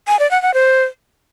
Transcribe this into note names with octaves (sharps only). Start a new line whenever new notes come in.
G#5
D5
F#5
F#5
C5